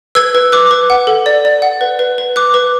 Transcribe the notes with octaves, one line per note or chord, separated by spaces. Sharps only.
B4 E6 G#6
B4
B4 D6 F#6
B4
F#5
A4
D5
D5
F#5
B4
B4
B4
B4 D6 F#6
B4